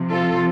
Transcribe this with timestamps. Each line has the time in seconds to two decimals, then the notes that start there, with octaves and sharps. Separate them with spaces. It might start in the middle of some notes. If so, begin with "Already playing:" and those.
Already playing: C3 F3
0.10 F4 A4